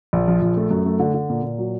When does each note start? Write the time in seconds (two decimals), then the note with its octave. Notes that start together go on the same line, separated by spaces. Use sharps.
0.13 A#1
0.28 F3
0.42 A#1
0.57 A3
0.71 F#2
0.86 A3
1.00 D3
1.14 D3
1.30 A#2
1.43 A#2
1.58 F#3